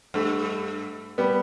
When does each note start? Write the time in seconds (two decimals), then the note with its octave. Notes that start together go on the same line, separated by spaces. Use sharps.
0.14 G2 A3
1.18 G3 B3